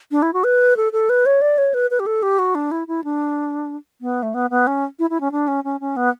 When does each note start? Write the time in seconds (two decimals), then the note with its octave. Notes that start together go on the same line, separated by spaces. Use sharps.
0.11 D4
0.22 E4
0.33 F#4
0.44 B4
0.77 A4
0.93 A4
1.09 B4
1.26 C#5
1.41 D5
1.58 C#5
1.74 B4
1.91 B4
2.00 G4
2.06 A4
2.23 G4
2.39 F#4
2.55 D4
2.71 E4
2.88 E4
3.04 D4
4.01 B3
4.23 A3
4.34 B3
4.50 B3
4.67 C#4
4.99 E4
5.10 E4
5.21 C#4
5.32 D4
5.48 C#4
5.64 C#4
5.80 C#4
5.97 B3